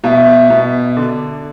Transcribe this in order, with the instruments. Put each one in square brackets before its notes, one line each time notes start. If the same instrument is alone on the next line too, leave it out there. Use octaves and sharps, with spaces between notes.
[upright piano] B2 [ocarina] F5
[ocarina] E5
[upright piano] B2
D3